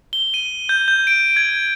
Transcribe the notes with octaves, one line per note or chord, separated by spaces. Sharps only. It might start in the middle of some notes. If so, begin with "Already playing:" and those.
G7
D#7
G6
G6
D7
G#6